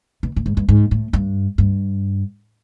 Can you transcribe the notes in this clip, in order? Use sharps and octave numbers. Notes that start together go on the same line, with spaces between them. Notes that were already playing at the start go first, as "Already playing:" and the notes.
B2
A2
G#2
G2
G#2
A2
G2
G2